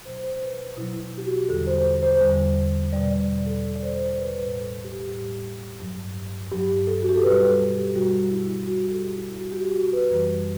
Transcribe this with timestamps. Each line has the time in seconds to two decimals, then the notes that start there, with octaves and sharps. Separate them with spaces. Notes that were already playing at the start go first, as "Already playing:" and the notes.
0.05 B2 F#3 C5
0.23 C5
0.41 B4
0.77 B2 F#3 E4
1.01 E4
1.18 G4
1.25 F#4
1.49 E2 D3 G3 A4
1.67 C5
2.03 C5
2.21 E2 D3 G3
2.93 B2 G3 D5
3.11 D5
3.46 A4
3.64 B2 G3 A4
3.76 D5
3.82 C5
4.00 C5
4.18 B4
4.36 A2 G3 B4
4.60 A4
4.84 G4
5.07 A2 G3 G4
5.80 G2 F#3
6.51 G2 F#3 G4
6.87 A4
7.02 F#4
7.09 G4
7.16 A4
7.23 B2 G3 B4
7.47 A4
7.71 G4
7.95 B2 G3 F#4
8.31 E4
8.67 B2 G3 F#4
8.84 G4
8.91 A4
9.15 E4
9.38 B2 G3 F#4
9.52 G4
9.56 F#4
9.75 F#4
9.93 B4
10.10 F#2 E3 G3